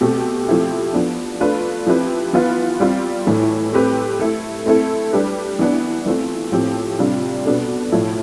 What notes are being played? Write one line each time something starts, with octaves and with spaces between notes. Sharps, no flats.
B2 A3 C4 G4
F3 A3 C4 E4 G4
F3 B3 D4
A3 D4 F4 B4
F3 C4 E4 G4 B4
E3 B3 F4 B4
G3 C4 F4
A2 E3 A3
A3 C4 G4 B4
A3 E4 A4
A3 C4 E4 A4
G3 D4 G4 B4
E3 B3 D4
E3 A3 C4 F4
A2 F3 A3 C4 G4
C3 G3 D4 F4
B2 B3 D4 A4
A2 F3 A3 E4